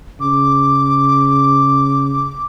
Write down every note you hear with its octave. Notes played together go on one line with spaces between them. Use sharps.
C#3 D6